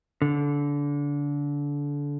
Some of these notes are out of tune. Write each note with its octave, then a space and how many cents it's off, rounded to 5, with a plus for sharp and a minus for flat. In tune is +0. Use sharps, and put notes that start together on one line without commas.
D3 -25